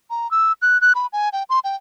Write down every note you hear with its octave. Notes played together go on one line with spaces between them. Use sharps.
A#5
E6
F#6
F#6
B5
G#5
G5
C6
G5